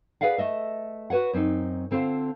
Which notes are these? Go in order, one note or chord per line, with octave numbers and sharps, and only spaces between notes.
G#4 A#4 B4 D5 F5 F#5
A3 D#5 E5
F#4 B4 C#5 F#5
F#2 C4 D4 D#4
D3 C4 F4 A#4 C5